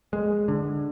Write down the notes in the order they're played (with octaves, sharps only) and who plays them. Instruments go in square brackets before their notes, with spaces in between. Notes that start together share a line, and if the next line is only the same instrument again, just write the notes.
[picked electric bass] G#3
D3